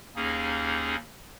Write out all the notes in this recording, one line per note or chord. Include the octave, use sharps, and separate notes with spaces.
D#2 A#3 C#4 D#4 G#4